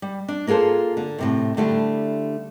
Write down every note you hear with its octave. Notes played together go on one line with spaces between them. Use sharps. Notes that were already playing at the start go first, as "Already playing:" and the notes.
G3
D4
A#3 F4 G#4 A4 C5
D3
A2 C3 D#3
D3 G3 A3 D4 E4 G4